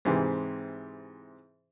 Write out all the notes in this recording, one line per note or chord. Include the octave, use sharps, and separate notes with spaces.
G#2 C3 E3